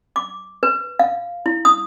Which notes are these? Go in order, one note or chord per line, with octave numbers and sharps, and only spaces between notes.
D6
B4
F5
E4
D#6